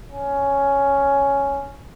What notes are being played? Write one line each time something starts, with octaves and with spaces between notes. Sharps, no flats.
C#4